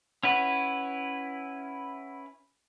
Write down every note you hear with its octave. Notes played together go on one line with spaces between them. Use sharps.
C#4 E4 B4 F#5